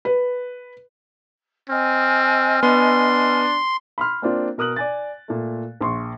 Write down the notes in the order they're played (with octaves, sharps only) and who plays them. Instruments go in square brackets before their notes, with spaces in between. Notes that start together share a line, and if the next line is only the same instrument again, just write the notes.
[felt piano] B4
[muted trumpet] C4 [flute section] D#5 G#5 F6
[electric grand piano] B3 [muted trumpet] D4 [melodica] C6
[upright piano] B5 C6 F6
A#3 C4 D4 F4
B2 A#4 D#6 F#6 F#7
D5 G#5 A6
A#2 A3
A#1 C6 C#6